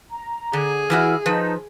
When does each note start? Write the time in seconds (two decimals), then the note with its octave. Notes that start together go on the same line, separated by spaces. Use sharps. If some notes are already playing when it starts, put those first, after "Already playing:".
0.11 A#5
0.53 D3 G#4
0.90 E3 E4 F#4 E6 F6
1.26 F3 D#4 B4 A5